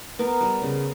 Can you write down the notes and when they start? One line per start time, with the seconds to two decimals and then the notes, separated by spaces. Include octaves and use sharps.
0.19 B3 A#4
0.41 G3
0.62 C#3